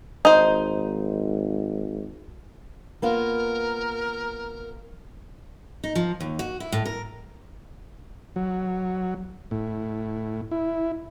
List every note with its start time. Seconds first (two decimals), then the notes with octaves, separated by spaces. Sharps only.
0.25 G#1 D#4 C5
3.02 A#3 B3 F4 A#4
5.84 D#4
5.95 F3
6.20 D#2
6.39 F#4
6.60 E4
6.72 A2
6.85 A#4
8.36 F#3
9.51 A2
10.51 E4